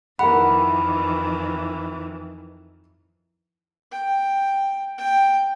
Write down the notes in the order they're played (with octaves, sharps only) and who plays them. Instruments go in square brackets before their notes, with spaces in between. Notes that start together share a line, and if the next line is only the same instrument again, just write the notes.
[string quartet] F2 D#3 E3 [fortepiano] A#4 F#5 [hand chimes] B5
[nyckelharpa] G5
G5